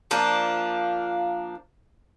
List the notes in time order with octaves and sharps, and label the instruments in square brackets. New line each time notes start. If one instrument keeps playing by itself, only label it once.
[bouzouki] F3 A#3 D4